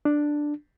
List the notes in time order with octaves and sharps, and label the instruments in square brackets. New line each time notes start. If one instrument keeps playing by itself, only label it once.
[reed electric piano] D4